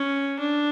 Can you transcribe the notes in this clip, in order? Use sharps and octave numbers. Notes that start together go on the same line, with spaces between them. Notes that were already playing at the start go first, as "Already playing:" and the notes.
Already playing: C#4
D4